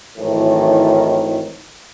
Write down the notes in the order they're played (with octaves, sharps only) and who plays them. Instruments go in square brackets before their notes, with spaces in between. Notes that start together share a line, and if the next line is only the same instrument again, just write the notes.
[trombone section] G#1 A2 D#3 E3 F#3